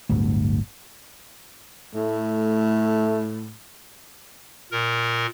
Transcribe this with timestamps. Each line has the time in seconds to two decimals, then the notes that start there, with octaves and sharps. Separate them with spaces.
0.09 D1 G1 D2
1.95 A2 A3
4.72 A#2 A#4